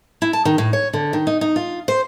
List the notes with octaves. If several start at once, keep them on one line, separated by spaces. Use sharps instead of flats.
E4
A5
D#3
A2
C#5
D3
D#3
D#4
D#4
F4
C5